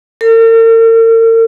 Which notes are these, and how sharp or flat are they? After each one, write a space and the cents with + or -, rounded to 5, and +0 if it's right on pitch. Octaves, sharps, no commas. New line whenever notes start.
A#4 -45